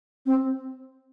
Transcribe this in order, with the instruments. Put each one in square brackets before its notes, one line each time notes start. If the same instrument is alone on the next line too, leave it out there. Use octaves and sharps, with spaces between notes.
[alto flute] C4